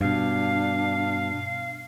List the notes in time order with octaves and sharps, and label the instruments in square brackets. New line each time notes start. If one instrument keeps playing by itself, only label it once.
[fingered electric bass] G2 B2 [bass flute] D4 [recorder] F5